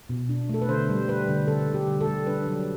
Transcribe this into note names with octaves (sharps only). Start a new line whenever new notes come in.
B2
D4
A3 A4
B4
D3 C5
G3
G3 B4
D3
D3 A4
G3
G4
D3
A4
G3
D4 B4
F#3